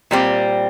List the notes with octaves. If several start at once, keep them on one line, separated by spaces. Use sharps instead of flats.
A#2 G3 C4